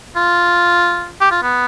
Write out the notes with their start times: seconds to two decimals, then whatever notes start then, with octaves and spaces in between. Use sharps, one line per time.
0.16 F4
1.21 G4
1.31 F4
1.43 B3